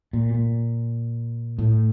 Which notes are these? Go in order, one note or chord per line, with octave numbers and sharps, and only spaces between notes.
A#2
A#2
A2